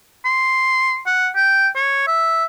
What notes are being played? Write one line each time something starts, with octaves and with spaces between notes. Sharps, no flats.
C6
F#5
G5
C#5
E5